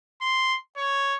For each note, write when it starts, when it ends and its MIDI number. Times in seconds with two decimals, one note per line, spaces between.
0.22 0.57 84
0.77 1.17 73